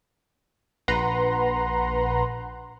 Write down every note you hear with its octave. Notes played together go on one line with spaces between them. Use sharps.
A#1 B4 F#5 A#5 C6